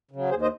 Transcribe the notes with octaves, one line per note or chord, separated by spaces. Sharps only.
C#3 F#3
D#2 G#4 C5
C5 D#5